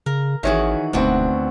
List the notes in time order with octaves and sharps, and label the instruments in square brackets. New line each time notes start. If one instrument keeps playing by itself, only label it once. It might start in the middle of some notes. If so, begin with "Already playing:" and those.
[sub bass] C#3 [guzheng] A#4
[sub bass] G#1 [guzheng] D#3 E3 F#4 [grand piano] G#4 C#5 E5
[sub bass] E1 [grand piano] D2 C4 [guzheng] B3 D4 F#4